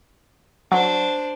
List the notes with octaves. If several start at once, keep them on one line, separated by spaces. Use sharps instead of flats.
F#3 D4 C5